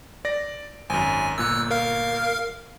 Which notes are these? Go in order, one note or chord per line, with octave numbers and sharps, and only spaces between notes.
D5 A#6
G#1 F#2 G#5
G1 A#2 E6 F#6
A#4 F5 F6